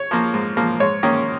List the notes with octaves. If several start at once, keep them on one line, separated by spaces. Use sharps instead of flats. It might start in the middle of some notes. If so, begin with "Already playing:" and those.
Already playing: C#5
F3 A#3
G#2
F3 A#3
G#2 C#5
D#3 A#3 C#4